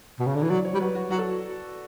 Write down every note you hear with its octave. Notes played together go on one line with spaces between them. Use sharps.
B2
C#3
D3
E3
F#3 D5
C#5
G3
F#3 B4
F#4
F#3 F#4
A4